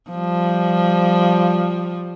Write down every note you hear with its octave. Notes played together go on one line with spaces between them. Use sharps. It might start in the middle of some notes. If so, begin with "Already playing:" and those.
F3 G3